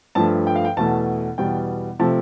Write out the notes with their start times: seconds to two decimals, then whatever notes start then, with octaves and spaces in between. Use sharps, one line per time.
0.15 G2 F3 A3 A5
0.47 G5
0.56 F5
0.65 G5
0.77 E2 B2 A3 A5
1.38 E2 B2 G3 G5
1.99 C3 F3 A3 A5